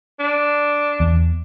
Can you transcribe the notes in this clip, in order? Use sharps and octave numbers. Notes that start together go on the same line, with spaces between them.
D4
E2